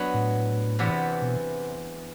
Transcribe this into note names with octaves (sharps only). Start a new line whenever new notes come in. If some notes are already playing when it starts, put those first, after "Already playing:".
Already playing: F#3 B3 D4 F#4
A2
E2 C3 E3 B3
B2